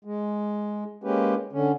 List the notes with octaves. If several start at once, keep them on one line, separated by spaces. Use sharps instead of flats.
G#3
G#3 A#3 C#4 G4 B4
D3 C#4